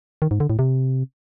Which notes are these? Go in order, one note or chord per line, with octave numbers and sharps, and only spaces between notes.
D#3
G#2
D3
A2
C3